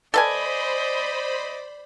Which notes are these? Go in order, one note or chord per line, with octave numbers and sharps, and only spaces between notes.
A4 B4 C5 D5 D#5 G#5 B5